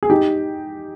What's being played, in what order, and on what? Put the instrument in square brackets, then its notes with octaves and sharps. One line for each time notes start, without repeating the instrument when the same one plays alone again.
[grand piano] G#4
D#4 G4